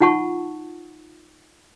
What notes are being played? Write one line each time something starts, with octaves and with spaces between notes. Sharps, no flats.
D#4 F4 F#5 A5 C#6